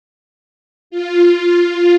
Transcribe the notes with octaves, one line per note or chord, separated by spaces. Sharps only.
F4